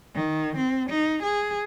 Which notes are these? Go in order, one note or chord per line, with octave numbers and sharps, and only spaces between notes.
D#3
C4
D#4
G#4